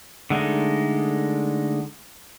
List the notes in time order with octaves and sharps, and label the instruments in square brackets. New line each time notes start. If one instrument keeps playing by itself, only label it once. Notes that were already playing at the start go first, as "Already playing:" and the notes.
[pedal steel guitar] D3 G#3 A3 D#4